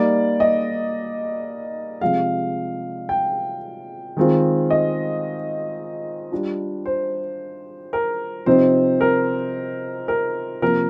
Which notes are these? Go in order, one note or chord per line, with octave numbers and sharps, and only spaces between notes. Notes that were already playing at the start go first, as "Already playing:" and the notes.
Already playing: G3 A#3 D#4 D5
D#5
C3 F3 G#3 F5
G5
D#3 G#3 C4 F4
D#5
G3 D4 F4
C5
A#4
C3 F3 C4 D#4 C5
A#4
A#4
C3 F3 A#3 A#4